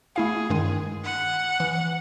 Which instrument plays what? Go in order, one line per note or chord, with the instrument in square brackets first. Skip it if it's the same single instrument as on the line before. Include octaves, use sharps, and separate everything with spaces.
[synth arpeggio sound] A3 E4 F5 [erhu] G#4
[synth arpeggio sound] G2 D#3 G#3
[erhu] F#5
[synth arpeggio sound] E3